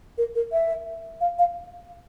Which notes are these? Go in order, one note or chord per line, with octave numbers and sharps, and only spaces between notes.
A#4
A#4
E5
F5
F5